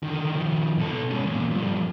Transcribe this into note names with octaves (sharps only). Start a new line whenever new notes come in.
D3 D#3
D#3 F3
B2 A4
G#2 C#4
E2 A#2
G2 F3